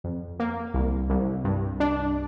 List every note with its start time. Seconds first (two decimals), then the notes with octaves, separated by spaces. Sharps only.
0.04 F2
0.40 A#3
0.74 C2
1.10 C2
1.44 G2
1.80 D4